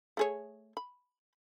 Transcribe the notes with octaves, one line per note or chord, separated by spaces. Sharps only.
A3 G#4 C#5
B5